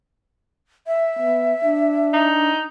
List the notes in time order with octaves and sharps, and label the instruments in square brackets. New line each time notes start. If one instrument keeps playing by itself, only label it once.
[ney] E5
[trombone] B3
D4
[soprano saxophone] D#4